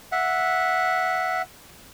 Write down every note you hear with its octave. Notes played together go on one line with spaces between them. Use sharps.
E5 F#5